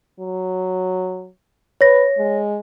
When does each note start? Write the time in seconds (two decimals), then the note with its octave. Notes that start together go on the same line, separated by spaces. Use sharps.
0.20 F#3
1.81 B4 C#5 A#6
2.18 G#3